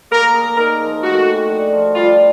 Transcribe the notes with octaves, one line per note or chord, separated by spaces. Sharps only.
A#3 A#4
G#4
D#4 A#4
F3
A3 F#4
G4
D4
F3
G3 F4